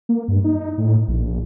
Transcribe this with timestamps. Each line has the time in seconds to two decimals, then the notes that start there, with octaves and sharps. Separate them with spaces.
0.09 A#3
0.28 G2
0.44 D#4
0.78 A2
1.08 A#1